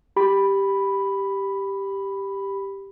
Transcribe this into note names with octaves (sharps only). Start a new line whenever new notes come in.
G4 B5